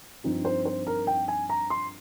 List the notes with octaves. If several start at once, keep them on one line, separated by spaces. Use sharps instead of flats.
G2 F3 C4 D#4
C5
C5
A#4
G5
G#5
A#5
C6